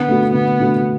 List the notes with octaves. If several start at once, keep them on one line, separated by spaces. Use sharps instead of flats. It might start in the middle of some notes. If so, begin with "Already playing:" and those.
Already playing: D3 B3
A3 D4 F#4
D3 B3
A3 D4 F#4